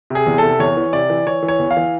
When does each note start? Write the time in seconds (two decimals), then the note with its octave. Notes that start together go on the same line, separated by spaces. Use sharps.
0.10 C3 G#4
0.27 E2
0.38 C3 A4
0.59 E2 C#5
0.77 E3
0.93 C3 D5
1.10 E3
1.27 E3 C#5
1.43 E3
1.48 C#5
1.59 E2
1.71 F5
1.77 E3